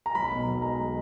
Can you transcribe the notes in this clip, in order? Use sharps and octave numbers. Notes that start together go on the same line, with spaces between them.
A#5
B1 B5
B2
B1
G#3 A#5